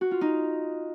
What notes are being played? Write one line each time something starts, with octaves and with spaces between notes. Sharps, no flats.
F#4
F4
D#4